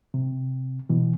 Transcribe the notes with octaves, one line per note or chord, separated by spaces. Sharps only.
C3
B2 E3